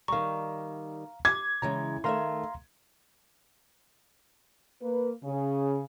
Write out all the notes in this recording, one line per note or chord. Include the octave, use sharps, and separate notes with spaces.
D#3 G3 F5 A#5 C#6
D6 G#6
C#3 E3 G#3 A#5
D#3 A3 E5 F5 A#5 C6
A#3 B4
C#3